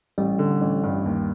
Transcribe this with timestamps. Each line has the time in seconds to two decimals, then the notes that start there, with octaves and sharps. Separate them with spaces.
0.18 A1 G3
0.39 D3
0.61 A1
0.84 G2
1.06 D#2